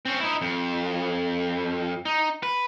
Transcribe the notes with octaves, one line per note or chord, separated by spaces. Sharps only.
C4 C#4
D#4 E4
F2
D#4
B4